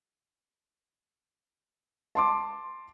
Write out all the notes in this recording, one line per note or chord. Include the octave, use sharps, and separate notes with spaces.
A5 C6 D6